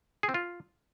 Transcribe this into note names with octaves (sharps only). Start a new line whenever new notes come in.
G#4
C4
F4